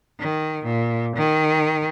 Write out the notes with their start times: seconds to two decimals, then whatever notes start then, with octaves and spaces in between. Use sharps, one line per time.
0.20 D#3
0.65 A#2
1.17 D#3